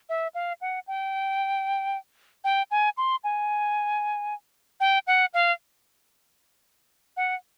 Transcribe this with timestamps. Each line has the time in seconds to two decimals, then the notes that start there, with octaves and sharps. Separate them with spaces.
0.09 E5
0.34 F5
0.61 F#5
0.87 G5
2.44 G5
2.71 G#5
2.97 C6
3.24 G#5
4.80 G5
5.07 F#5
5.34 F5
7.17 F#5